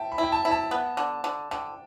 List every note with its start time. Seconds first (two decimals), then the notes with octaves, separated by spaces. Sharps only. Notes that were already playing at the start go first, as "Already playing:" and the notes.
Already playing: E5 G5 A5
0.12 B5
0.18 E4 G5
0.32 A5
0.45 E4
0.51 A5
0.71 B3
0.97 D3
1.24 D3
1.51 D3 G5